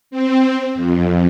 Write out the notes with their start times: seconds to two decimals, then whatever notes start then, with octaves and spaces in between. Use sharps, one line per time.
0.11 C4
0.75 F2